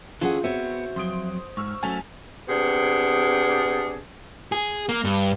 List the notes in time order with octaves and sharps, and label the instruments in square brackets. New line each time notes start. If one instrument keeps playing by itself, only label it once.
[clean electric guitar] E3 A4 [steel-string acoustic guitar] C#4 G#4 F#5 [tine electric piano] F4
[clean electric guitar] B3 [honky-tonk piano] C4 [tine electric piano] F#4 E5 [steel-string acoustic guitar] C5 C#5
[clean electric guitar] F2 F#3 [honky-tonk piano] C6 D#6 D7
[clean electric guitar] G#2 [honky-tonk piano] C#6 E6 F6
[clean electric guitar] F#3 A3 F#4 [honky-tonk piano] C#4 A5 F7 [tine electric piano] G#5
[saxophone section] C3 B3 D4 G#4
[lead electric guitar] G#4
A#3
G2